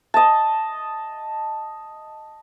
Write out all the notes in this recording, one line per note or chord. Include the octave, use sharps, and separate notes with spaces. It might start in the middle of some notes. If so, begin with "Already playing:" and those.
D#5 A5